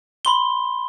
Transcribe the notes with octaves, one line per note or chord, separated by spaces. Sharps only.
B5 C6 G7